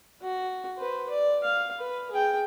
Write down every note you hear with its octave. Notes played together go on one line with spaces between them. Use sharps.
F#4
B4 C5
D5
F5
B4
G#4 G5